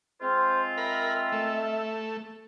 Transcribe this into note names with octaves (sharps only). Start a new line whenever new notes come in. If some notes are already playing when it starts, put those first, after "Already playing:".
G#3 C4 F4 C5
A#4 E5 B5
A3